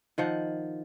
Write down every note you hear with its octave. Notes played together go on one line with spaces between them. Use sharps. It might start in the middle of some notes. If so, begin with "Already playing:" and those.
D#3 F3 F#5